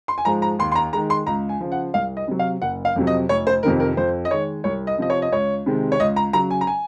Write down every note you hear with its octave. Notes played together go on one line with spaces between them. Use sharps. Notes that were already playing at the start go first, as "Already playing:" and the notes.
C6
G#5
G#2 F3 G#3 A#5
A#5
D#2 C6
C6
A#5
D#3 G#3 A#5
C6
C#2 A#5
G#5
C#3 F3
F#5
C2 F5
D#5
C3 F#3
F5
F#1 F#5
F5
F2 C3 F#3
D#5
F1 C#5
C5
F2 C3 D#3 A#4
A#4
F2 C5
D#5
D#3 G#3 C#5
C2 C#5
D#5
C3 F3 D#5
C#5
D#5
C#2 C#5
C3 D#3 G#3
C#5
C#2 D#5
A#5
C#3 F#3 A#5
G#5
A#5
G#5